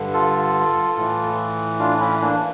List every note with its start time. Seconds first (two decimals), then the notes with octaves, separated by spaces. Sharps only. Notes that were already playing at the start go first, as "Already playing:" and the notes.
Already playing: G2 D3
0.14 F4 A4
0.97 A2 E3
1.80 D4 F4
2.00 C#4 E4
2.21 A#3 D4